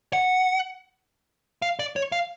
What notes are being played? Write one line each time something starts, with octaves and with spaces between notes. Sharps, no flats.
F#5
F5
D5
C#5
F5